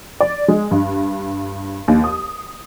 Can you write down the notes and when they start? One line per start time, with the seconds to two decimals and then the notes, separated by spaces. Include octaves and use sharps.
0.20 D5
0.48 G#3
0.71 G2
1.88 D#2
2.04 D#6